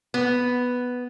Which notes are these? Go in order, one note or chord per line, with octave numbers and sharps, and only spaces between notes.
B3